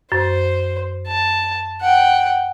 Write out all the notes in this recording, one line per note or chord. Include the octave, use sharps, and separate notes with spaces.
F#2 C5
A5
F#5 G5